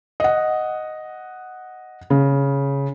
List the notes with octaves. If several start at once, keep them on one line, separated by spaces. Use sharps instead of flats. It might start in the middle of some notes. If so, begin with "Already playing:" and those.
D#5 F#5
C#3